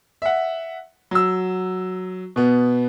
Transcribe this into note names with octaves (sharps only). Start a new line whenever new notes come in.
E5 F#5
F#3 E6
B2 B3